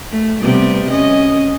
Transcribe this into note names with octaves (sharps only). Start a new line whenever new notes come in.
A3
C3 G3 B3
C#4 D#5